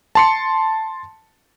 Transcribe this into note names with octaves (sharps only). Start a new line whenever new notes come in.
A5 C6 C#7